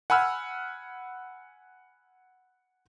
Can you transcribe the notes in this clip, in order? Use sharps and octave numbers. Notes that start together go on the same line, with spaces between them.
F#5 G#5 B5 E6 F6